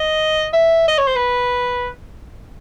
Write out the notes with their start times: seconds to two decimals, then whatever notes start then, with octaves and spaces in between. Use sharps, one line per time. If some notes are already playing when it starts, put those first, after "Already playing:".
Already playing: D#5
0.53 E5
0.88 D#5
0.98 C#5
1.07 C5
1.16 B4